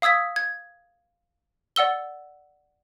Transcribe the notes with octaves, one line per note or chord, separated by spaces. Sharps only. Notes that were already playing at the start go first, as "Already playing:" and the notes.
F5 D#6 E6 G#6 B6
G#6
D5 F#5 E6 G7